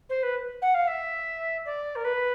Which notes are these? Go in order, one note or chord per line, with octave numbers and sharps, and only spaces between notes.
C5
B4
F#5
F5
E5
D5
A#4
B4